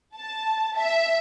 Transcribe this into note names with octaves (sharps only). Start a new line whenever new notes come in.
A5
E5